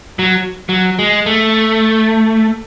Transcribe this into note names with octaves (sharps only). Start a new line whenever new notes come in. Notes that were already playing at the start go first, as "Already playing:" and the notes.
F#3
F#3
G#3
A3